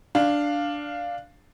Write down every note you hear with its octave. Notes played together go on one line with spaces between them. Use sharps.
D4 F5